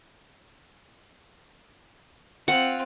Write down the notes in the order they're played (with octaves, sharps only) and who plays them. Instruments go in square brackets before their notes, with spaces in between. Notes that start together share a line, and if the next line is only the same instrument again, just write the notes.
[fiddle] C4 F4 [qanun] F#5